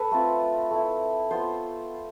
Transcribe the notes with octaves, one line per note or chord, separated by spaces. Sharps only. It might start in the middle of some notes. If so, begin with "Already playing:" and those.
Already playing: A4 B4
A3 C4 F4
A3 E4
B3 F4 C5